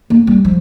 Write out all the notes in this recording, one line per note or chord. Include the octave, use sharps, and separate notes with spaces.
A#3
G3
F3